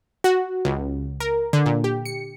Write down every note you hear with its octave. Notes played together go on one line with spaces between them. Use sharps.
F#4
C#2
A#4
D3
A#2
G4
C#7